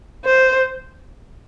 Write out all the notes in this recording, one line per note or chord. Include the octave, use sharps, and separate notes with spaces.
C5